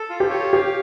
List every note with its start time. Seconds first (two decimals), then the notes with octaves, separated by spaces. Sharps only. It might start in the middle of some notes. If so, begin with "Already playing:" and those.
Already playing: A4
0.10 F4
0.20 G4
0.30 C#5
0.53 G4 F5